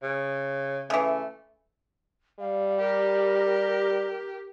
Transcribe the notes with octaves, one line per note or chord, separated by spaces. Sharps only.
C#3
C#3 E3 A3
G3 F5
G4 A#4